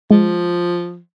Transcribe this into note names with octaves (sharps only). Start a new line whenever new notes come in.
F3 G#3